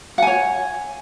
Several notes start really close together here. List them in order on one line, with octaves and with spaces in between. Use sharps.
F#5 G#5 C#5